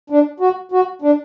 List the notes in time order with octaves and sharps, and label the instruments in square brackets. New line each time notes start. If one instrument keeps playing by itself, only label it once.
[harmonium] D4
F#4
F#4
D4